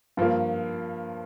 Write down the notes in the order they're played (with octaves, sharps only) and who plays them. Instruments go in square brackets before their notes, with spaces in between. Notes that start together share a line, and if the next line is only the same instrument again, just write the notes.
[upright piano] G2 F3 A#3